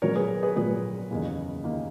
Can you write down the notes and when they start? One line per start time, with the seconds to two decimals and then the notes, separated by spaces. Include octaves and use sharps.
0.02 A#1 A#2 F#3 B3 A#4 C#5
0.15 G#4 B4
0.43 G#4 B4
0.56 A#1 A#2 F#3 B3 G#4 B4
1.10 F#1 E2 D#3 A#3
1.64 D#3 A#3